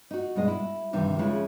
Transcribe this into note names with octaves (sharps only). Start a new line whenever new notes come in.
D#4 F#4
G2 B2 G#3 D#5
E4
G2 C3 D#3 E3
C#3 F3 G#3 C#4 E4 C#5